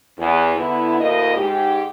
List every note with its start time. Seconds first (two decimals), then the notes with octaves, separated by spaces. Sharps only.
0.18 E2
0.56 D3 B3 E4
0.99 D2 A2 A#3 D#5
1.36 G#2 G4